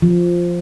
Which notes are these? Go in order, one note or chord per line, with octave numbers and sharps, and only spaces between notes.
F3